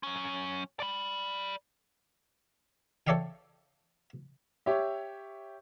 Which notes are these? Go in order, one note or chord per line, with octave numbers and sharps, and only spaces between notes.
F#3 C#4
D5 B5
A4 C#5 D5 E5 F5 G5
G4 C#5 E5